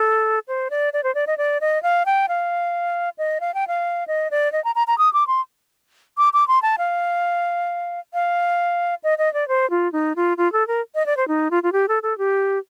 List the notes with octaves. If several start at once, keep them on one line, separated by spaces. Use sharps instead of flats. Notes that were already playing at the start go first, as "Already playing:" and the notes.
Already playing: A4
C5
D5
D5
C5
D5
D#5
D5
D#5
F5
G5
F5
D#5
F5
G5
F5
D#5
D5
D#5
A#5
A#5
A#5
D#6
D6
C6
D6
D6
C6
A5
F5
F5
D#5
D#5
D5
C5
F4
D#4
F4
F4
A4
A#4
D#5
D5
C5
D#4
F4
F4
G4
A4
A4
G4